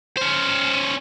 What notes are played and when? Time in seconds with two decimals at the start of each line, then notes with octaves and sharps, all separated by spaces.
0.18 C#4 C5